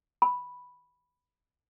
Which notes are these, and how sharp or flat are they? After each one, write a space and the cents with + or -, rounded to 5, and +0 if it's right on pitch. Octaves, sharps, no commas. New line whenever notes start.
B5 -5